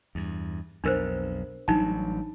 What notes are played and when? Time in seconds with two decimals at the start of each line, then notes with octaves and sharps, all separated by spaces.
0.15 E2 G2
0.84 B1 F2 D4 A#4 C5
1.68 A1 F#3 G3 D4 D#4 A5